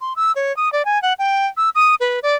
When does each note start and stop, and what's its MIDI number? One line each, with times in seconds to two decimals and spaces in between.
0.01 0.13 84
0.16 0.32 88
0.36 0.55 73
0.57 0.71 87
0.73 0.85 74
0.85 1.01 80
1.02 1.13 78
1.19 1.47 79
1.57 1.70 88
1.75 1.95 87
2.00 2.19 71
2.23 2.35 74